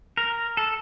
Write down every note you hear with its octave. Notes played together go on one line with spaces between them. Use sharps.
A#4
A4